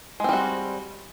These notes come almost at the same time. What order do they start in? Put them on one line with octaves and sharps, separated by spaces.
G#3 C4 G3 F#4